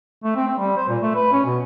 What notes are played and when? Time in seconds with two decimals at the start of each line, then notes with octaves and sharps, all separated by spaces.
0.24 A3
0.36 C4
0.47 C4
0.58 G3
0.77 C5
0.89 A#2
1.03 A3
1.15 B4
1.33 C#4
1.46 B2